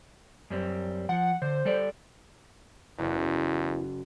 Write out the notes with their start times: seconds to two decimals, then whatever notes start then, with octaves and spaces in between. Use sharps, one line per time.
0.50 F#2 G3 C4
1.09 F3 F#5
1.42 D3 C5
1.65 G3 A4 D5
2.99 F#1 E2 E4 F#5